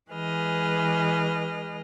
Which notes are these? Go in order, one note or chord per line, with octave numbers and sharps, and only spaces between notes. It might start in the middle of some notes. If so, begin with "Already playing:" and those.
E3 G#3 G#4 B4 D#5 F6